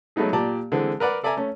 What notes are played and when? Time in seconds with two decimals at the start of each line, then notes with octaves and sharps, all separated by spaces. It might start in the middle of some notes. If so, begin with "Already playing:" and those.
0.16 F#3 G#3 A3 B3 D#4 G#4
0.33 A#2 G4 D5 A5 A#5
0.72 D3 E3 G#3 C4
1.00 A#4 B4 D5 F#5
1.24 A4 D5 E5 G#5 A#5
1.37 A3 C#4